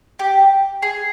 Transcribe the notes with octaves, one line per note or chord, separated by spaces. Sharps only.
G4
G#4